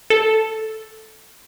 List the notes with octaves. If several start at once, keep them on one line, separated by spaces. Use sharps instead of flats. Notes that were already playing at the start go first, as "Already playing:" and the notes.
A4